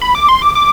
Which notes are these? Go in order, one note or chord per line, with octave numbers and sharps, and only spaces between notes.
B5
D6
C6
D6
D6